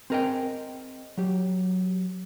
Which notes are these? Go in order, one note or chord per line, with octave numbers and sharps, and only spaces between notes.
C4 G#4 A#4 D5 D#5 G5
F#3 G4